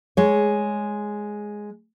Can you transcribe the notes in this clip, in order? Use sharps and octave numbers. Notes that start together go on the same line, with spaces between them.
G#3 C#5